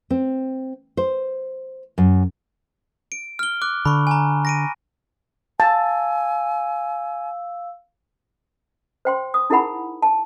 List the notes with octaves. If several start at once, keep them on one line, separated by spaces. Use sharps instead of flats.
C4
C5
F#2
D7
F6 G7
D6 F#6
D3 B5 C#6
G#5 A#5
A#6 D7 D#7
F5 G#5 A5 E6
C5 G5 C6
D#6
D#4 E4 G#4 A#4 F#5 B5
A5